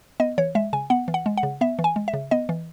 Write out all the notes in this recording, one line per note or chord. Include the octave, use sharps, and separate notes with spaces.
B3 D#5
E3 C#5
G#3 E5
C#3 G#5
B3 F#5
E3
F#5
G#3
F#5
C#3
B3 E5
E3
G#5
G#3
E5
C#3
B3 D#5
E3